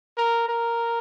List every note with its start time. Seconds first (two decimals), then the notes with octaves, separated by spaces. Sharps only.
0.17 A#4
0.49 A#4